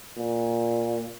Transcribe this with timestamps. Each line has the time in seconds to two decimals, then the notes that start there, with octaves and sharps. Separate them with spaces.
0.17 A#2